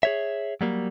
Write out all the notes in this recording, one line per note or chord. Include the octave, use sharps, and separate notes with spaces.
G#4 C#5 E5
F#3 G3 A#3